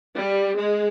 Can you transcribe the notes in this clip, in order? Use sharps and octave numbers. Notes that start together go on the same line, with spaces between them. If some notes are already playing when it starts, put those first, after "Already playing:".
G3
G#3